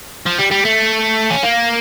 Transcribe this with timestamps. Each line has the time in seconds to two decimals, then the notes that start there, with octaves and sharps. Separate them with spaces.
0.26 F3
0.39 G3
0.51 G3
0.65 A3
1.31 C#4
1.43 A#3